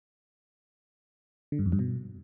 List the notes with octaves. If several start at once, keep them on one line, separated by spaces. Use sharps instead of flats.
D3
G2
F2
G2
B2